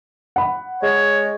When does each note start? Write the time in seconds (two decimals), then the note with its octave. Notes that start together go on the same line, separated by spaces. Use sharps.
0.36 F#5 B5
0.83 G#3 C#5